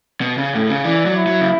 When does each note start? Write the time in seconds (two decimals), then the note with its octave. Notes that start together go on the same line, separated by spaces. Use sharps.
0.21 B2
0.38 C#3
0.53 A2
0.69 C#3
0.85 E3 D5
1.06 F#3
1.16 E4
1.26 F#3
1.41 C#3